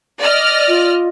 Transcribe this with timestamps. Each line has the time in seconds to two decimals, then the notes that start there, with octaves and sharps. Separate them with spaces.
0.20 D5 D#5 F6
0.68 F4